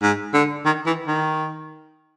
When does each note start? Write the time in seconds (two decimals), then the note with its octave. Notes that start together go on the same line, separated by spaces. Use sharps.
0.02 G#2
0.34 D3
0.65 D#3
0.86 E3
1.07 D#3